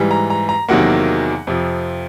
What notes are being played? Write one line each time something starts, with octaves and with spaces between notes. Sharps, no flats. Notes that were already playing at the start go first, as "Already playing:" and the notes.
Already playing: G#2 E3 G3
A#5
A#5
A#5
E2 C3 D#3 F#3 A#3 F#5
F2 C3 F3